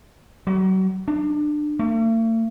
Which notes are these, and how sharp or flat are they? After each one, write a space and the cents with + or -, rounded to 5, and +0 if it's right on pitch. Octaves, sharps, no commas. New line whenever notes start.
F#3 +35
D4 +25
A3 +45